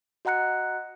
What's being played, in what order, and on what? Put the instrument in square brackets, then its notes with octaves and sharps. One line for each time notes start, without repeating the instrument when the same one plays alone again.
[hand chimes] F#4 D#5 F#5 A#5 F#6 C#7